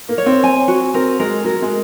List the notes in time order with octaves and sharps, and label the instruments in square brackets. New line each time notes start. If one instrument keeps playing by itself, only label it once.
[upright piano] A#3
[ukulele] C#5
[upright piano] C4
[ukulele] G#5
F#4
[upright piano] C4 [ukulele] A#4
[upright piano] G#3 [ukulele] A#4
[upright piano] F#3 [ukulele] A#4
[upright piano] G#3